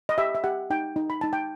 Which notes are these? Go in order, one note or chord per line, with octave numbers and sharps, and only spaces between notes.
D#5
G4 E5
E5
G4 F#5
D#4 G5
D#4
B5
D#4 A5
G5